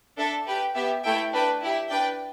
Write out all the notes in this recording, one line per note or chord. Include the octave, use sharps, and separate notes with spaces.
D4 A4 E5 A5
G4 B4 G5
B3 G4 E5 G5
A3 E4 A4 E5 G5
D4 B4 G5
E4 G4 E5
D4 B4 D5 G5